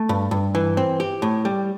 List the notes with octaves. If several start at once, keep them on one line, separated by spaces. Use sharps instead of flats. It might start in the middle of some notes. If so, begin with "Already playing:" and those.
Already playing: A3
G2
G2
E3
C4
G4
A2
G3